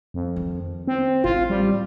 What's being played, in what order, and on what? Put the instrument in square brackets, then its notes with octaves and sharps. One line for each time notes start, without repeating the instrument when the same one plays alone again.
[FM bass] F2
[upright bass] D#3
[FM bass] C4
[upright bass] A1 [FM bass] F4
[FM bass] G3